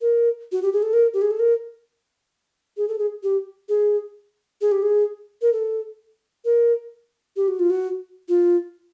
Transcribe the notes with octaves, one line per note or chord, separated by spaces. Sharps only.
A#4
F#4
G4
G#4
A4
A#4
G4
G#4
A4
A#4
G#4
A4
G#4
G4
G#4
G#4
G4
G#4
A#4
A4
A#4
G4
F#4
F4
F#4
F4